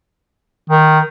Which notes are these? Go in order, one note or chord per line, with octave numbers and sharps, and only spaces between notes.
D#3